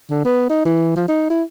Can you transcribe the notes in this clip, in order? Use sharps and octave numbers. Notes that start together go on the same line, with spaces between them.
D3
B3
D#4
E3
F3
D#4
E4